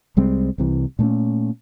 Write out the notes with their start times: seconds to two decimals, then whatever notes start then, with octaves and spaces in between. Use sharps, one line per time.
0.17 C2 G3 G#3 C4
0.58 C2 C3 E3
0.99 A#2 A3 B3 C#4